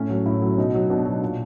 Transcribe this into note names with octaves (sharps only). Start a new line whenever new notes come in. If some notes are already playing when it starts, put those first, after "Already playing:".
Already playing: A2 C#4
F#3
A2 E4
F#3
B2 D#4
F#3
B2 D4
F#3
A#2